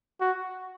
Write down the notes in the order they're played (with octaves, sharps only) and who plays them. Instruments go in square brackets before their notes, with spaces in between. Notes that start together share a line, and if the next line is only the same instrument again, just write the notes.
[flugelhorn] F#4